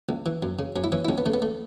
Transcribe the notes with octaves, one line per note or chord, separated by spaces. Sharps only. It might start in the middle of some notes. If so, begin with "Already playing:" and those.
C#2
E3
F#2
C#3
F#2 C#4
E4
E3 C#4
E4
C#2 C#4
B3
C#3 A3
B3
A3